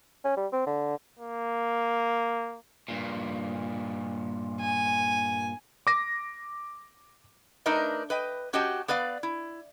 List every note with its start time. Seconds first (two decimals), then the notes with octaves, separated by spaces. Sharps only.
0.25 C#4
0.37 G3
0.52 C4
0.67 D3
1.19 A#3
2.88 G2 A#2
4.61 G#5
5.87 D6 A#6
7.66 A3 D4 D#4 A#4 B4 D#5
8.10 B4 D#5 G5
8.53 C#4 F#4 G4 D#5 G5 A5
8.88 B3 B4 D5 F5
9.23 E4